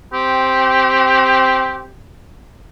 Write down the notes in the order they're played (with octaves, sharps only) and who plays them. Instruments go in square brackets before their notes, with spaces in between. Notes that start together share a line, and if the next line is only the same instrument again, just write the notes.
[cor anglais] C4 [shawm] G4